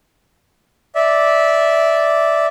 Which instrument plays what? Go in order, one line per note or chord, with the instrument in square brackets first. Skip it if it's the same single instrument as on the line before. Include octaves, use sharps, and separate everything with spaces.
[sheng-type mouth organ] D5 E5